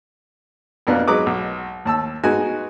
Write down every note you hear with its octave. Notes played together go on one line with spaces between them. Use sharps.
F2 B2 A#3 B3 D4
F#3 G#3 D#4 B4 D6 D#6
B1
D#2 A5 E6
G#3 B3 D#4 F#4 G#5